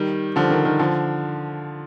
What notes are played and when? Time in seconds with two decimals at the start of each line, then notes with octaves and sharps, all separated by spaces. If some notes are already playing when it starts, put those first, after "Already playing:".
Already playing: D#3 G3
0.36 D3 F3
0.51 D#3
0.65 D#3
0.79 D3 F3